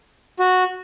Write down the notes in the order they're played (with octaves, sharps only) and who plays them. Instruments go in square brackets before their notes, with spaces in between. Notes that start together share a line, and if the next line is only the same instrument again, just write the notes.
[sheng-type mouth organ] F#4